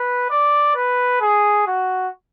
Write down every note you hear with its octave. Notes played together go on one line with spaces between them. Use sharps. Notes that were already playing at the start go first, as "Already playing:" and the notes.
Already playing: B4
D5
B4
G#4
F#4